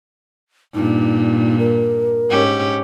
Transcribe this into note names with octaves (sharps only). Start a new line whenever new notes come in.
G2 A#2 D#4
A#4
G#2 C#4 G4